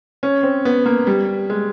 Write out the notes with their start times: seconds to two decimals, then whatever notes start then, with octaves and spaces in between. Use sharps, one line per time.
0.23 C#4
0.43 C4
0.65 B3
0.86 A#3
1.07 G3
1.50 G#3